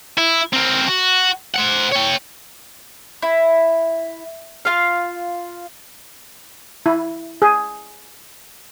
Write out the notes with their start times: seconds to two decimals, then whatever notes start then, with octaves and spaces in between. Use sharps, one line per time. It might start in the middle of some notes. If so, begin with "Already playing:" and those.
0.18 E4
0.53 C4 A#4
0.88 F#4
1.54 C5 F#5
1.92 C#5 G5
3.22 E4
4.65 F4 F5
6.86 E4
7.42 G#4